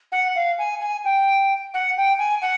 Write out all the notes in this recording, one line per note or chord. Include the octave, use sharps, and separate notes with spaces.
F#5
F5
G#5
G#5
G5
F#5
G5
G#5
F#5